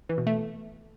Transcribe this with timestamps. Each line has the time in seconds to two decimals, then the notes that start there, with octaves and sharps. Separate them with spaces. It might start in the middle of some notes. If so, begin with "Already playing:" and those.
0.09 E3
0.18 B2
0.27 A3